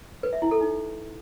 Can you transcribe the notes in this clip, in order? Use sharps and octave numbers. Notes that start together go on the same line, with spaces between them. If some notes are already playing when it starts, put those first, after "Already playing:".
B4
E5
E4
A4
D#4